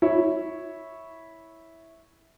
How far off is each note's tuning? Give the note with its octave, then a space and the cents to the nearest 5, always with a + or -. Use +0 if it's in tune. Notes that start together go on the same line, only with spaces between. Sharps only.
E4 -10 C#5 +0